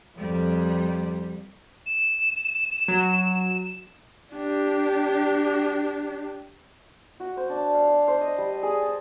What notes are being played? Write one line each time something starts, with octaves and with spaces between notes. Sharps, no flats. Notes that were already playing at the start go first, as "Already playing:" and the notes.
F2 G3
E7
F#3
D4 G4
F#4
C5
D4
F5
F5
C5
D#5
G3
G#4
A5